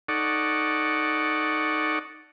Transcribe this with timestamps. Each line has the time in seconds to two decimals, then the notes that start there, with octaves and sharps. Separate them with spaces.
0.08 D#4 A4 D5 F#5 C#6